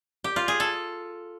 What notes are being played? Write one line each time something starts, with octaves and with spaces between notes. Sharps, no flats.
G4
F4
G#4
A4